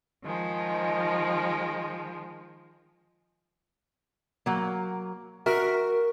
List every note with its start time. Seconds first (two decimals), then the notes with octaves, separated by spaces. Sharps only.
0.25 D#3 F3 G#3
4.46 F#3 A#3
5.46 F#4 A#4 E5